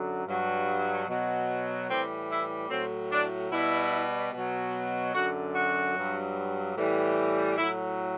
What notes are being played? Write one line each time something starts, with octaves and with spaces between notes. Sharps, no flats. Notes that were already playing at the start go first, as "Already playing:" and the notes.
Already playing: F#2 D3 F#3
G2 F#3
B2 F#3
A2 E3 G3 C4
E4
A2 F#3 C4
D4
B2 G3 E4
B2 F#3
F#2 D3 F#3 F#4
F#4
G2 F#3
A2 E3 G3
A2 F#3 E4